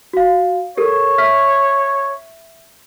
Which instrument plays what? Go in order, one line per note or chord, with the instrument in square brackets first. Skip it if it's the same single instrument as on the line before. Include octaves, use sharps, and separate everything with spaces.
[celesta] F#4 F5
[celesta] G4 A4 A#4 [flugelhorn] C#5
[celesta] E5 F6 B6